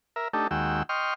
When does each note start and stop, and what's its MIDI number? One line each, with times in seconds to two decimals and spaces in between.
0.16 0.28 70
0.16 0.28 76
0.33 0.48 57
0.33 0.48 62
0.33 0.48 63
0.33 0.48 67
0.33 0.48 69
0.51 0.83 39
0.51 0.83 56
0.51 0.83 66
0.51 0.83 79
0.51 0.83 88
0.89 1.14 75
0.89 1.14 79
0.89 1.14 84
0.89 1.14 85
0.89 1.14 89